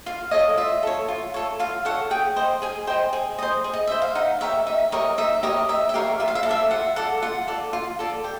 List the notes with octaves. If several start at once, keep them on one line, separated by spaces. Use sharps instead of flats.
F4 F5
A4 C#5 D#5
F4 E5
A4 C#5
F4
A4 C#5
F4 F5
A4 C#5 F#5
G#4 G5
C5 D#5
G#4 G#5
C5 D#5 G5
G#4
C5 D#5
G#4
D#5
C5 D#5 E5
F5
D#4 F#5
G4 A#4 C#5 E5
D#4 E5
G4 A#4 C#5 D#5
D#4 E5
G4 A#4 C#5 D#5
D#4 E5
E5
G4 A#4 C#5 F5
F4 E5
F5
E5
F5
A4 D5 E5
F4 F#5
A4 D5 F#5
F4 F#5
A4 D5
F4
A4 D5
G4